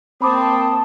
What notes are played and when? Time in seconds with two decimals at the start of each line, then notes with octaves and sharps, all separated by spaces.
0.22 A#3 C4 A5 B5 D6 D#6